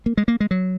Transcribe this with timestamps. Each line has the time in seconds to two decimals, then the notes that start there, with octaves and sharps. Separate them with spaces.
0.06 A#3
0.17 G#3
0.28 A#3
0.40 G#3
0.51 F#3